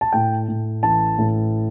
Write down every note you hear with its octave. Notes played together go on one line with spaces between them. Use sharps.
A5
A2 G5
A2
A1 A5
A2